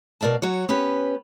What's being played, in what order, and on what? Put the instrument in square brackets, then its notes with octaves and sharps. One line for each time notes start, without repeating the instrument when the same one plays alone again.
[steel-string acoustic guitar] B2 A#4 D5 F5 A5
F#3 F#4 C#5
B3 C#4 G4 B4